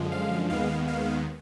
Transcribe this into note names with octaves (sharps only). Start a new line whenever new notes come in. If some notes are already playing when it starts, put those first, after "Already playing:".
Already playing: F#2 D3 F3 G#3
F5
D#2 D#3 G#3 B3 F5
F5